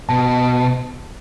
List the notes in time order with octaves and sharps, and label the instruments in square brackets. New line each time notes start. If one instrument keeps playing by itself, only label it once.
[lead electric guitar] B2 [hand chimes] A5